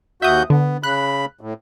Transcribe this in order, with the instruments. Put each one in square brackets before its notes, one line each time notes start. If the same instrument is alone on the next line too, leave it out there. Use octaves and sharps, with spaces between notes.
[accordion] D#2 F#4 G6 [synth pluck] E5 D#6
[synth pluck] D3 [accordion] B3
[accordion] C#3 B5 [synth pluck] F#6
[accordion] A2